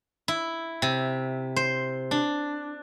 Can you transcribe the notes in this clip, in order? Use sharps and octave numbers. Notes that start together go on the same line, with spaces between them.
E4
C3
C5
D4